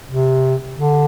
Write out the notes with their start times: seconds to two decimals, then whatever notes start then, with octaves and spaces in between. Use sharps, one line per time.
0.11 C3
0.75 D3